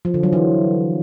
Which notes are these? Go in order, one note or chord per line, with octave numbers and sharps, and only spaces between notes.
F3
D3
F#3
E3